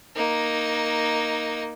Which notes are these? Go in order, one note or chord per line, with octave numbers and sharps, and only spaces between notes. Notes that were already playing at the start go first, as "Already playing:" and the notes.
A#3 D#4